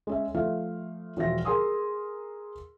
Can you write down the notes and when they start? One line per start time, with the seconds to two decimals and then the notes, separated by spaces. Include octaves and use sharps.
0.07 G#3 C#4 E5
0.35 F3 A3 E5 F5
1.17 E1 F3 F4 F#4 E5 A#6
1.45 G#4 A#4 G#5 C6 D#6 E6